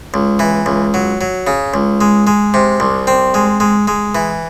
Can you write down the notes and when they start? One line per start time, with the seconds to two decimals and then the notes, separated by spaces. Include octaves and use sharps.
0.14 C#2
0.39 E3
0.66 C#2
0.94 F#3
1.21 F#3
1.47 C#3
1.74 C#2
2.01 G#3
2.27 G#3
2.54 C3
2.80 C2
3.07 C4
3.34 G#3
3.60 G#3
3.88 G#3
4.15 E3